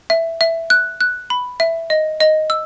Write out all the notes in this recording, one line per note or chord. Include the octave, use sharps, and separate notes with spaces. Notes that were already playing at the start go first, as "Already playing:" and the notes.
E5
E5
F#6
F#6
B5
E5
D#5
D#5
E6